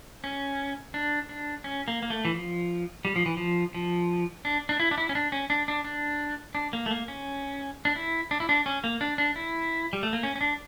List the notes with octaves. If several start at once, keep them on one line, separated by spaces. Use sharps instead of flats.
C#4
D4
D4
C#4
A#3
A#3
A3
E3
F3
G3
F3
E3
F3
F3
D4
D4
E4
D4
E4
C#4
D4
C#4
D4
D4
D4
D4
A#3
A3
A#3
C#4
D4
E4
D4
E4
D4
C#4
A#3
D4
D4
E4
G3
A3
A#3
C#4
C#4
D4